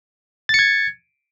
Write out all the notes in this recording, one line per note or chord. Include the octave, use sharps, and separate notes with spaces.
G#6 A6 C#7